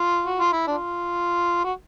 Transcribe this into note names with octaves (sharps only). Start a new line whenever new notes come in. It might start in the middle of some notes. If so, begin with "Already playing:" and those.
Already playing: F4
F#4
F4
E4
D4 F4
F#4